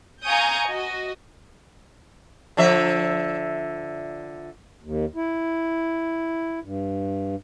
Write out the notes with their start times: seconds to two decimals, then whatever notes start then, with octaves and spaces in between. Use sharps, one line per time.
0.24 F5 G#5 A#5 C#6 D#6 G6
0.67 F#4 D#5
2.57 D3 F3 E5
4.83 D#2
5.15 E4
6.63 G2